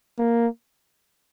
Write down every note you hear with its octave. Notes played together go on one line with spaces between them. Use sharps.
A#3